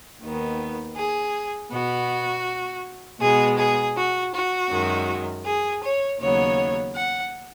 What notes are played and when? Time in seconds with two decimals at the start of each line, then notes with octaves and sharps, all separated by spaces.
0.21 D#2 D#3 B3
0.96 G#4
1.71 B2 B3 F#4
3.21 B2 G#3 B3 G#4
3.57 G#4
3.96 F#4
4.33 F#4
4.70 F#2 D#3 G#3
5.45 G#4
5.82 C#5
6.19 D#2 C#3 F#3 B3 C#5
6.94 F#5